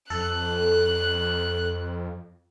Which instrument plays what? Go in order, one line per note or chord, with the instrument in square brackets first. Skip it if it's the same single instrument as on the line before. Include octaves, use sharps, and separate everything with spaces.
[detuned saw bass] F2 [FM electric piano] A4 [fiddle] F#6